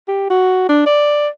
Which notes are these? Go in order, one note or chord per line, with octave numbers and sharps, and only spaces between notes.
G4
F#4
D4
D5